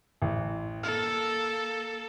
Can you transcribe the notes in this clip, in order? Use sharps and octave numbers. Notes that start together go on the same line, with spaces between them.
A1
A#3 A4 F6